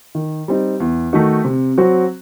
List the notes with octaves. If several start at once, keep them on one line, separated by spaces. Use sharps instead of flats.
D#3
G3 C4 D#4
E2
D#3 A3 D#4 F#4
C3
F#3 C4 F#4